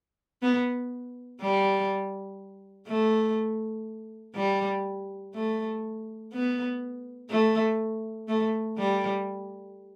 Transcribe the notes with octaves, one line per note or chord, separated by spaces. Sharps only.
B3
G3
A3
G3
A3
B3
A3
A3
G3